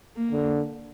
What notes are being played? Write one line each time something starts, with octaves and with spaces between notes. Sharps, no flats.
A#3
D3